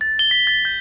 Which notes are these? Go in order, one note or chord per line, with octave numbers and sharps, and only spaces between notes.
A6
G7
B6
A6
G6